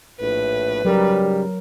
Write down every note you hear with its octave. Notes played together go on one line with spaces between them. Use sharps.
A#1 A2 B4
G#2 C#3 F#3 G3 A#4